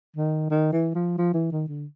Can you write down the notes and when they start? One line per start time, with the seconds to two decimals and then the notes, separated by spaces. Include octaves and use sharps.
0.16 D#3
0.50 D#3
0.73 E3
0.95 F3
1.18 F3
1.34 E3
1.52 D#3
1.68 D3